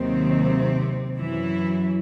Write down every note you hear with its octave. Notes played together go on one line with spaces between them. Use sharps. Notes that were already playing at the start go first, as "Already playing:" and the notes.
Already playing: D#2 C3 D#3 F#3 C4
F#2 E3 F#3 E4